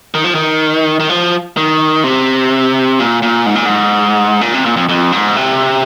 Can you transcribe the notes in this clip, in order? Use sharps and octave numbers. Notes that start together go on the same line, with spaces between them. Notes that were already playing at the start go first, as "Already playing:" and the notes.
D#3
F3
D#3
D#3
F3
D#3
C3
A#2
A#2
G#2
A#2
G#2
A#2
C3
A#2
F2
F2
G#2
C3